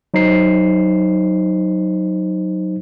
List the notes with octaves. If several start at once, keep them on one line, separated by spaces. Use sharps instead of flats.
F#3 D#4 C5 C7